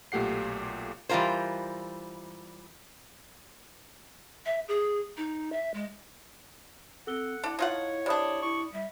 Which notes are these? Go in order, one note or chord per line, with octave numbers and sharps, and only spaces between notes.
B1 A#2 A3 G4 F#5 C7
E3 G3 A3 F4 A#4 C5
E5
G#4
D#4
E5
G#3
C4 A4 F#5 E6 G7
D4 E4 A5
D#4 F4 C#5 F#5
C3 D4 D5 B5 D#6
E4 C#6
G3 E5